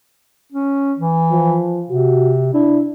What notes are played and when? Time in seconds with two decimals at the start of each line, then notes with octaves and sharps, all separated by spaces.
0.53 C#4
0.98 E3
1.31 F3
1.90 C3 F#4
2.54 D4 E4